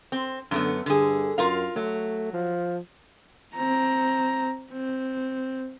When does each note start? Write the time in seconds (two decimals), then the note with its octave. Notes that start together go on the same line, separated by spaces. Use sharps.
0.12 C4
0.51 F#2 D3 A3 B3
0.86 G2 D3 G#4
1.38 F#2 F4 A#4 F5
1.76 F#3 A3
2.34 F3
3.55 C4 A#5
4.71 C4